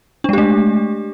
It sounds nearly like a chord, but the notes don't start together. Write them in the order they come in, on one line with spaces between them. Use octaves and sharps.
D4 G#3 G4 A3